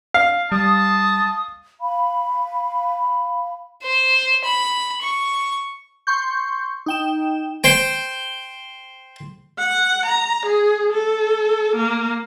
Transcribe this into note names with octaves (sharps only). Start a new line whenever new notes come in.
F5
G3 A5 D#6
F5 B5
C5
B5
C#6
C6 C#6 G6
D#4 G5 E7
C5 G5
F#5
A#5
G#4
A4
A#3